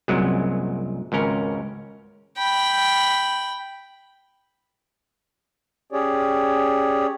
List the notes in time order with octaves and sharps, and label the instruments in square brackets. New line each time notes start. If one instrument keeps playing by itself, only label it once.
[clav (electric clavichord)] C2 F#2 A#2 F#3 G#3
G#1 C#2 C#4 A#4
[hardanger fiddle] G5 B5
[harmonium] C#4 G4 G#4 C#5 D5